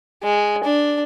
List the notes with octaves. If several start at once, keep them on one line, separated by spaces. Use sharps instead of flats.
G#3
D4